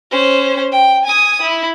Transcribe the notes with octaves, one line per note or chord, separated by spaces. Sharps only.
C#4 C5
G5
G#5 D#6
E4